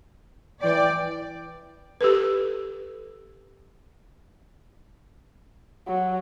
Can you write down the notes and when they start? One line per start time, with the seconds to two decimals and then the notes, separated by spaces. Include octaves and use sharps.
0.63 E3 D5 G5
2.01 G4 A4 B4
5.88 F#3